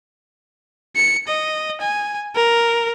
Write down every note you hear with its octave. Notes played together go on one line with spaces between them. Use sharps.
C#7
D#5
G#5
A#4